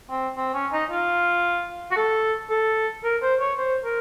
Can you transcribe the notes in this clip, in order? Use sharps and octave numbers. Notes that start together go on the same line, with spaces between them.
C4
C4
C#4
D#4
F4
F#4
A4
A4
A#4
C5
C#5
C5
A#4